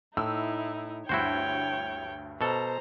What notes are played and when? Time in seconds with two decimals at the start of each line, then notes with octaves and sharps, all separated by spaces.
0.17 A2 D#4 E4 E6
1.09 D2 G2 E4 F#4 C5 C#5 G5
2.41 B2 A4 C5 A#5